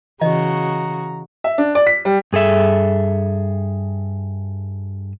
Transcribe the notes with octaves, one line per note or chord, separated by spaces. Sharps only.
C#3 E3 F#4 D#5 A#5
E5
D4
D5
B6
G3
G2 G#4 A4 E5